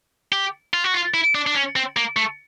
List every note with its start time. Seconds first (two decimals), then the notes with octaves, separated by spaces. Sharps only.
0.32 G4
0.74 F4
0.84 F#4
0.94 F4
1.14 E4
1.35 D4
1.47 D4
1.55 C#4
1.76 C4
1.97 A#3
2.16 A3